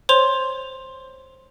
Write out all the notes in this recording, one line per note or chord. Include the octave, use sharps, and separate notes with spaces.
C5 C#5 C6 F7